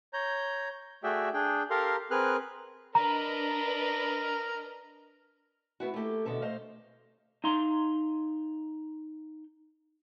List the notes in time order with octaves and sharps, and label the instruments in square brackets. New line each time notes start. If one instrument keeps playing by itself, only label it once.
[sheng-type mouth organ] C#5 A#5 G6
A3 F#4 G#4 D5 E5 G5
D4 G#4 G5
G4 A4 A#4 F5 A#5 C6
C4 G#4 A#4 B4 F6 F#6
[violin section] D4 B4 D#5 [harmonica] A#4 [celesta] A#5
[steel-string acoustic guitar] A3 B3 E4 F#4
A3 A#3 G4 A4
D#2 B2 D3 A4 E5
A3 C5 D#5 F5
[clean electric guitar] D#4 F5 A#5 C6